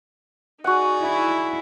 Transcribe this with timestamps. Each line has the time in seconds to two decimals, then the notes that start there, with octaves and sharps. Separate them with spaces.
0.64 D#4 F#4 G#4 D5 F#5
1.02 E4